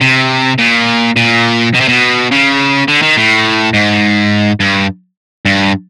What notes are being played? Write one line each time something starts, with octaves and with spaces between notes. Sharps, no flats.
C3
A#2
A#2
B2
C3
B2
C#3
D3
D#3
A2
G#2
G2
G2